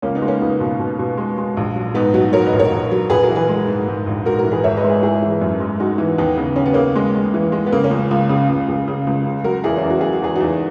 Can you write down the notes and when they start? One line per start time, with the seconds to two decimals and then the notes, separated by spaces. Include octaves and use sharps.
0.02 C#2 A#3 C#4
0.15 B3 D#4
0.22 G#3
0.28 A#3 C#4
0.41 C#2 B3 D#4
0.60 B2
0.79 B2
0.99 B2
1.17 G#3
1.38 G#3
1.57 A#1
1.76 F#3
1.94 G#2 B3 D#4
2.14 F#3 D#4 F#4
2.33 F#3 A#4 C#5
2.46 B4 D#5
2.53 A#1
2.59 A#4 C#5
2.72 A#1
2.92 F#3
3.10 A#1 G#4 B4
3.23 F#4 A#4
3.29 E3
3.35 G#4 B4
3.49 G#3
3.67 G#2
3.88 G#2
4.07 A#1
4.25 G#2 F#4 A#4
4.38 F#4 A#4
4.45 E3
4.51 G#4 B4
4.64 G#1 C#5 E5
4.76 B4 D#5
4.84 G#3
4.89 G#4 B4
5.02 G#3 E4 G#4
5.22 E3
5.42 F#2
5.60 G#3
5.80 G#3 D#4 F#4
5.98 E3
6.18 D#2 B3 D#4
6.37 C#3 B3
6.56 C#3 C#4
6.66 B3
6.74 C#3 A#3 C#4
6.95 G#3
7.15 G#3
7.34 E3
7.52 G#3
7.66 B3
7.72 C#3 A#3
7.84 A#3 C#4
7.91 C#2
8.11 C#2
8.29 C#3
8.49 C#2
8.68 C#2
8.88 C#3
9.07 C#2
9.26 C#3
9.44 F#3 F#4 A#4
9.64 E2 E4 G#4
9.77 C#4 E4
9.83 E2
9.90 F#4
10.01 F#3 G#4
10.13 F#4
10.22 E2 G#4
10.35 E2 D#4 F#4